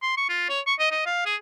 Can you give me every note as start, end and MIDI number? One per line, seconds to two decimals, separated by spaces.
0.02 0.13 84
0.17 0.27 85
0.29 0.48 65
0.49 0.60 73
0.67 0.74 85
0.79 0.89 75
0.91 1.05 75
1.06 1.23 77
1.26 1.36 68